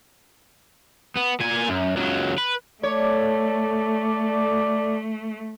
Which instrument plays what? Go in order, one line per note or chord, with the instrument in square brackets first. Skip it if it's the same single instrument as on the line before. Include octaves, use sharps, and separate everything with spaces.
[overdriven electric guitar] B3
A#2 G#5
F#2
C#2 F#3
B4
[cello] A3 [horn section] A4 D5 [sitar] C#5